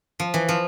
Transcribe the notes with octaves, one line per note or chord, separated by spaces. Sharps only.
F3
E3
F3